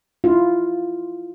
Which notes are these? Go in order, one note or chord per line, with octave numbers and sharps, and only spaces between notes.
E4 F4